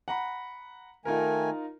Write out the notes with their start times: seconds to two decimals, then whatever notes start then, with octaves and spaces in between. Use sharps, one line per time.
0.08 F#5 A#5 B5
1.05 D#3 A3 D#4 F4 A#4 G#5